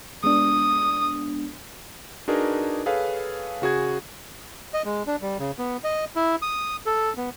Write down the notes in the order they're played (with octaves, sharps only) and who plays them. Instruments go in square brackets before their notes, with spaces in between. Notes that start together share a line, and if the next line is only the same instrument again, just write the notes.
[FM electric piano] G#3 B3 D4 [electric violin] D#6
[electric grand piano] D4 D#4 F#4 G#4 A#4 B4
G#4 A4 B4 C#5 F5
C#3 F#4 G#4 G#6
[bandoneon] D#5
G#3
D4
G3
C#3
B3
D#5
E4
D#6
A4
B3